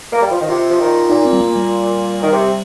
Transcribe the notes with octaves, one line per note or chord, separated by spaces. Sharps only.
A#3
G3
F3
D#3
C3 F4
F3
A#2 D#3
A#2 D#4
C4
G3
A#3
G3
D#3
C3